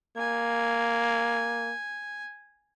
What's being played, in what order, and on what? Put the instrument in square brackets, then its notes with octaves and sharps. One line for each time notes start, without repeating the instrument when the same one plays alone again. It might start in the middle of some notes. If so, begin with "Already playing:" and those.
[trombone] A#3 [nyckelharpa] G#5